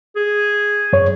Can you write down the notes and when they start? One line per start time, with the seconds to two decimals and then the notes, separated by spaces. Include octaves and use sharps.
0.16 G#4
0.93 F#2 C#5